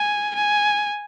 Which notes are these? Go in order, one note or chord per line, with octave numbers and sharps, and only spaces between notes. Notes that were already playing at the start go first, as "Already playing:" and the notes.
Already playing: G#5
G#5